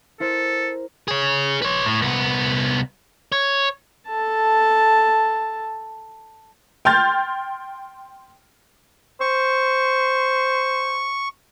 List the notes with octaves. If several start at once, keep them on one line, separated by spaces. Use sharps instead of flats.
E4 A4 A#4 C5
G#4 C#5
B4 C#5
A2
C2 B3
C#5
A4 A5
G5 C6 F6 G6 A6
C5 C#6